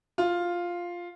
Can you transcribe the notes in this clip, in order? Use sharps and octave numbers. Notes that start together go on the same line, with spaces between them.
F4